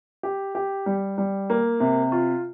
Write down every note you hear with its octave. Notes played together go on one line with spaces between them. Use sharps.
G4
G4
G3
G3
A#3
C3
F4